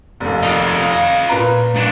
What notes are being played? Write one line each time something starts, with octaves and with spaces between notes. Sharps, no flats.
F1 D#2
F4 D#5
A#2 B4 A#5
G#2 D4